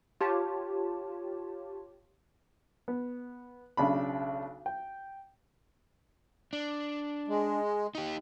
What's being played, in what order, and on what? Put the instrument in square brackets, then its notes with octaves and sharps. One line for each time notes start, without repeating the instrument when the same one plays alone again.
[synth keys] F4 G4 C#5 A5
[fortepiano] B3
B1 C#3 D4 B5
G5
[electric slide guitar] D4
[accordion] G#3
[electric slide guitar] D#4 G4